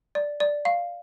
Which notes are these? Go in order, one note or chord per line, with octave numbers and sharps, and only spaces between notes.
D5
D5
F5